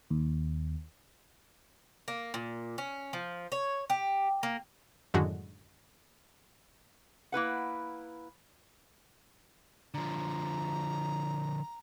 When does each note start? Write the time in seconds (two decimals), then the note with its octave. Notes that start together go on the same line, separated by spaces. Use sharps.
0.10 D#2
2.08 A#3
2.34 A#2
2.78 C#4
3.13 F3
3.52 C#5
3.90 G4
4.43 A#3
5.14 F#2 A2 D3 D#3 G#3 F#4
7.32 A#3 E4 B4 F#5
9.94 D3 F3 A#5